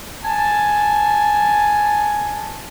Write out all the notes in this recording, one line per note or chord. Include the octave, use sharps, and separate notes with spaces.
G#5 A5